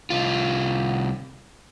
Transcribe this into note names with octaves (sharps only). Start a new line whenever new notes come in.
C2 F4